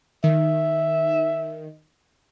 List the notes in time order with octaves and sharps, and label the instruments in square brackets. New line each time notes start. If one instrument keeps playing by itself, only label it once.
[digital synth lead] D#3 [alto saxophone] E5